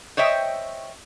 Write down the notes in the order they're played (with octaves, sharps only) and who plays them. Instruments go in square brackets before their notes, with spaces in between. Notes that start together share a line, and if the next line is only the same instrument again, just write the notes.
[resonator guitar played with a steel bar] C5 C#5 D#5 E5 G5